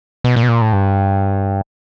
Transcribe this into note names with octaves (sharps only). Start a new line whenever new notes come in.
B2
A#2
B2
A#2
A2
G2